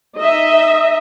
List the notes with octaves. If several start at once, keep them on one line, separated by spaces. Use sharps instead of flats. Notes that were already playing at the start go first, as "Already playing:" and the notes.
D#4 D#5 E5